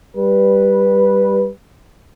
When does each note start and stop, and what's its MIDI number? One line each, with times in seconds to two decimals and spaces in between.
0.17 1.49 55
0.17 1.49 71